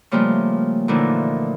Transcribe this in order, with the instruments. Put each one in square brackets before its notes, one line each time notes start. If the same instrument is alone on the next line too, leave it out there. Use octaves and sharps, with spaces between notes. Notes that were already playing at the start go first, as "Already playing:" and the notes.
[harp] C#3 F3 G3 A3 A#3 F4
A#2 D3 E3 F3 A3 D#4